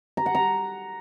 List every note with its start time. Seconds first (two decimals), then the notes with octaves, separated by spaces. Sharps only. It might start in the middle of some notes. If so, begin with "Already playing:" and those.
0.17 A#5
0.26 F#5
0.35 A#5